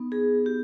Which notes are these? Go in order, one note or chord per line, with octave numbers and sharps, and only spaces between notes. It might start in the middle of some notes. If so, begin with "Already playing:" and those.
Already playing: B3 D#4
G#4
G4